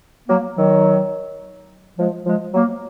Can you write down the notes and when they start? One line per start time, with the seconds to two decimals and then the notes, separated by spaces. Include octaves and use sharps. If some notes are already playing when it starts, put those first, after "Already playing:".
0.27 F#3 A#3
0.56 D#3 F#3
1.98 F3 G#3
2.25 F3 G#3
2.54 F#3 A#3